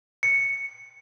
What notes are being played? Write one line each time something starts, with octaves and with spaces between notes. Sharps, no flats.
C#7